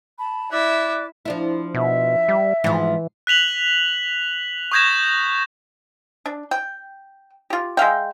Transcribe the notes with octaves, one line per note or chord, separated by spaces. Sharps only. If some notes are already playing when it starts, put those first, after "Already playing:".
A5 B5
E4 D5 E5 D6 F#6
F3 D4 E4
B2 E5
G3
G#2 E3 F3
F#6 B6 F7 F#7
C#6 D#6 G6 G#6 A#6 E7
D4
G5
F4 G4
G#3 E5 F5 G5